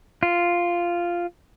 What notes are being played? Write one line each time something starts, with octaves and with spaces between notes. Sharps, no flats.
F4